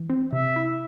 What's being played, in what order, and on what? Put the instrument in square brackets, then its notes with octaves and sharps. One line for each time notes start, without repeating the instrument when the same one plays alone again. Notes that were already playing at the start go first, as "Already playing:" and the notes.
Already playing: [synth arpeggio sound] E3
C4
[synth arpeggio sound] C3 [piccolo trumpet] E5
[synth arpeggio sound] E4